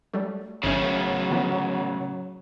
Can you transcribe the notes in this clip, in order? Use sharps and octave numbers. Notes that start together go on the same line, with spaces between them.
F#3 G3 A3
G#1 A2 C#3 F#3 C#4
D3 F3 B3